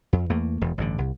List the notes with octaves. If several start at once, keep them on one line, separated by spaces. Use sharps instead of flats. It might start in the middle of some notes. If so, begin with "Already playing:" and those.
F2
E2 A3 A#3
E1 E2
A1 G2 D3
C2